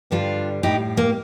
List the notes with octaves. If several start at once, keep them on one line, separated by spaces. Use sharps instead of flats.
G2 D3 G3 D4 F4
A2 G3 D#4 G4
A#3